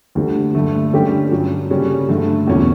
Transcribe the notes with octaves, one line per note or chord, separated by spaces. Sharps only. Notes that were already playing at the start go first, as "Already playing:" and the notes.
D2 D3 G3
G2 D3 A3
D3 G3 C#4 G4
G2 F#3 C#4
C#3 G3 C#4 F#4
G2 D3 A3
E2 B2 F#3 C#4